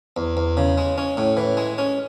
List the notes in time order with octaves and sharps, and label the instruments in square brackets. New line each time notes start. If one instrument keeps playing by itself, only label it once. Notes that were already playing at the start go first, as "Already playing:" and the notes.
[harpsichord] E2
E2
C#3
G#3
C#4
A2
E3
G#3
C#4